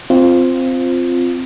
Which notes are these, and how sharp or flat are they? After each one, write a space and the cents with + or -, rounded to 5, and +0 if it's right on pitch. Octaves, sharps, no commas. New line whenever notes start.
C4 +0 F4 +0